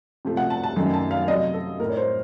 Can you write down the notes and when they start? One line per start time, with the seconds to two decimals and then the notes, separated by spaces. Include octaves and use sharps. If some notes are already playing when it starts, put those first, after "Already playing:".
0.25 C3 F3 A3
0.37 F#5
0.50 A5
0.64 A5
0.76 F#2 D#3 F#3 A3
0.94 A5
1.11 F5
1.28 C3 F#3 A3 D#5
1.54 A4
1.80 A2 A3 A#4
1.90 C#5
1.97 C5